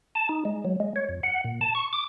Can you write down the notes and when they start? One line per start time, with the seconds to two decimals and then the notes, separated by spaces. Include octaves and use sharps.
0.15 A5
0.29 D#4
0.45 G#3
0.65 F#3
0.80 G#3
0.96 C#5
1.09 F2
1.23 F#5
1.44 A#2
1.61 A5
1.75 C#6
1.93 D6